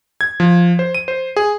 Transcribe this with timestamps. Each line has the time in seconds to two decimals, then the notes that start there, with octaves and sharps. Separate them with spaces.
0.21 G#6
0.40 F3
0.79 C5
0.95 D#7
1.08 C5
1.37 G#4